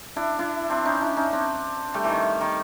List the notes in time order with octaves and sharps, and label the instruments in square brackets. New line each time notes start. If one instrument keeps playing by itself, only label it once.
[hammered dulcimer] D4 E4
D4 E4
C4 D4
C#4 D#4
D4 E4
C#4 D#4
C4 D4
G3 A3
E3
D#3
D#3